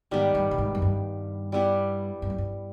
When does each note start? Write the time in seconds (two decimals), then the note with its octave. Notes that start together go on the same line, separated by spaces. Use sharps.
0.11 G#2 D#3 G3 B3
0.35 G2
0.51 A2
0.58 G#2
0.75 F#2
0.82 G2
1.52 G3 B3 E4
2.22 G2
2.30 F#2
2.38 G2